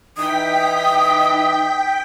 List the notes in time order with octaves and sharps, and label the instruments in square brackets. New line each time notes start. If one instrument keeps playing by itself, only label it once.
[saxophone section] E3 D#4 [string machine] G5 B6 [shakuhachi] D#6